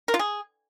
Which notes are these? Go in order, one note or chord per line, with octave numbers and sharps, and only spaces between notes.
A#4
F4
G#4